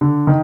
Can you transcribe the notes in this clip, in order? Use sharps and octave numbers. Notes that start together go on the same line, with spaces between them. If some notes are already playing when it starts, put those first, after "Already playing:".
D3
D#3